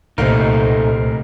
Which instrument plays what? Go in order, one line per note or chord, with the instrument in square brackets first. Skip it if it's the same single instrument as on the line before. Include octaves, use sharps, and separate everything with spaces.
[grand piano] F1 A#4 F5 [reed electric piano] C2 A#2 C5 [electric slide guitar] A3 D#4